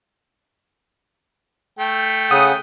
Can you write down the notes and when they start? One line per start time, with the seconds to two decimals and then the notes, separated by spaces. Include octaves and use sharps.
1.79 A3 G5
2.31 C#3 F#5 D#6